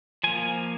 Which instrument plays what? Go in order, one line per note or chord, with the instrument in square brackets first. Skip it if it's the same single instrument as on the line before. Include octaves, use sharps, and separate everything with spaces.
[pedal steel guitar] F3 A#3 G#5